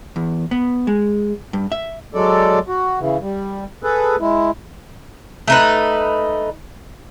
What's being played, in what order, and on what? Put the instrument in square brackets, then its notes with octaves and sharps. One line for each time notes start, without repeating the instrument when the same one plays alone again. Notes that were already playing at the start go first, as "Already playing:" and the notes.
[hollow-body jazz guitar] E2
B3
G#3
G2
E5
[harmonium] F#3 G#3 A4 D5
F#4
C#3 E3
G3
G#4 A4 B4
G#3 E4
[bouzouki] A3 D#4 B4